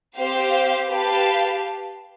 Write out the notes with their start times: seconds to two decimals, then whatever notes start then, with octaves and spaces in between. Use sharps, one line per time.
0.17 C4 G4 C5 F5
0.90 G4 B4 F5 A5